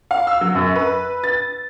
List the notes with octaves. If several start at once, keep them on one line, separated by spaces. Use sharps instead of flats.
F5
E6
F#3
F#2
B4
A6